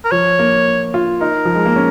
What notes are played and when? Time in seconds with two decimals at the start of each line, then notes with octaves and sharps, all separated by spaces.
0.05 A#4
0.11 F3 C#5
0.39 A#3
0.94 F4
1.21 D#4 A#4
1.45 F3
1.55 G#3
1.66 A#3
1.76 C#4